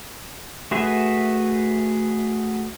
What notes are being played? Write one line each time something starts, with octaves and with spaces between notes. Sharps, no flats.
A3 F#4 G#4 B4 E5